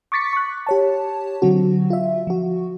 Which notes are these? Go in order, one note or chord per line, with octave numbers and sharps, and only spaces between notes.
C#6 D6 A6 B6 C#7
C#6 F#6
G4 C#5 A5
D3 F#3 C4 F#4
F4 E5
F3 F#4